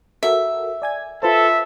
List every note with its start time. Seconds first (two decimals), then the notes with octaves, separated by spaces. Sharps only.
0.23 F#4 A4 A#4 E5
0.82 D5 G#5 G#6
1.23 F4 A4 B4 C5 E5